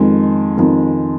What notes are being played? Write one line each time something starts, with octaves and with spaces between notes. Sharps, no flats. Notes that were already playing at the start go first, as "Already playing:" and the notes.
Already playing: F2 D#3 G#3
F2 D#3